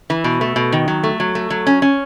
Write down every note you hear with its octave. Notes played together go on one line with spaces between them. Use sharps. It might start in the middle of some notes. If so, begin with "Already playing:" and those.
E3
B2
A3
B2
D#3
F#3
A3
F#3
A3
F#3
C#4
C#4